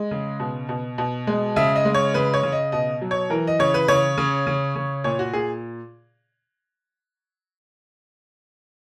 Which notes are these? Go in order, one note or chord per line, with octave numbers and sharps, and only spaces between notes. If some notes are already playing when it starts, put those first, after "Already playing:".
Already playing: G#3
C#3
B2
B2
B2
G#3
C#3 E5
D#5
G#3
C#5
C#3 B4
C#5
C#3
D#5
B2 D#5
F#3
C#5
E3 A#4
D#5
C#3 C#5
B4
C#3 C#5
C#3
C#3
C#3
A#2 C#5
F#4
A#2 G#4